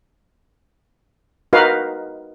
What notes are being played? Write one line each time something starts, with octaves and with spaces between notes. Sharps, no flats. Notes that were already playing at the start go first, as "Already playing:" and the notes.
D#4 F#4 A#4 B4 D#5 F5